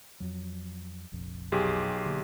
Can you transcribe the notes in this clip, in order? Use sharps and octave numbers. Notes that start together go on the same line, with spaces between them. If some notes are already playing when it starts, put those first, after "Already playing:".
F2 F#3
F1 A#1 F2
B1 G4 G#4
D3 A#3